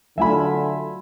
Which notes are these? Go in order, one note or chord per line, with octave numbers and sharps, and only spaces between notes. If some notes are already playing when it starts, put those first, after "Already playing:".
D3 F#3 A3 F4 E5 G#5 B5